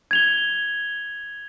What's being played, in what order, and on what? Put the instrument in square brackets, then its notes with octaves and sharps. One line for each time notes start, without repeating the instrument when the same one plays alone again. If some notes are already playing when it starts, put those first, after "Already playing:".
[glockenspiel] G#6 F7 G7